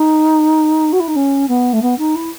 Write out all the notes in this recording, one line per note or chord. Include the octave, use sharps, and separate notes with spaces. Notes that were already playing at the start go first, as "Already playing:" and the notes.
Already playing: D#4
F#4
E4
D#4
C#4
B3
A3
B3
D#4
E4